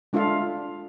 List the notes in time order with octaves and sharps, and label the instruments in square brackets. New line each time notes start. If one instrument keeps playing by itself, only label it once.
[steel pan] G#3 D4 F4 A4 E5 F5